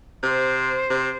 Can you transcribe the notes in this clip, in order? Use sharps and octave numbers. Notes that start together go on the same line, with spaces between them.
C3 C5
C3